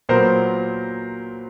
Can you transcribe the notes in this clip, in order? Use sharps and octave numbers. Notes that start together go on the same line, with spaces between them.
A#2 F#3 B3 A#4 C5